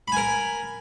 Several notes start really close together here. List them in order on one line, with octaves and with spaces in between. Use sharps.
B5 G#5 A#4